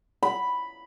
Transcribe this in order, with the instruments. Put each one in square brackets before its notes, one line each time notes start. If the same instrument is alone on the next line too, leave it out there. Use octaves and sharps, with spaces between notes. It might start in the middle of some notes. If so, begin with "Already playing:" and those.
[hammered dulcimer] B5